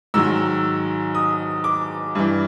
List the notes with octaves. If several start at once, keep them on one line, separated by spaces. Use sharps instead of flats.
G#2 D#3 F#3 E6
D#6
D6
G2 E3